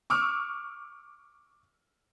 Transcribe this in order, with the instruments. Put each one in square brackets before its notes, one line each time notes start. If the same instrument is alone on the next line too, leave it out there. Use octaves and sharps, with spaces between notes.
[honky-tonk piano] C#6 D6 E6 F6